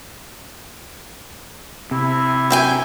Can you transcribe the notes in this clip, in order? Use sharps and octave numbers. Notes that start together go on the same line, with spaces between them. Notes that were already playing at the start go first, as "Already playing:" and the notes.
C3 E4
F#2 G5 G#5